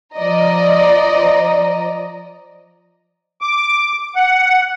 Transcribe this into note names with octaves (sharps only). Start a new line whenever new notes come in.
F3 D5 D#5 A#5
D6
F#5